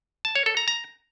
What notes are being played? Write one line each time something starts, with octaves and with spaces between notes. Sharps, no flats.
A5
C#5
A4
A#5
A#5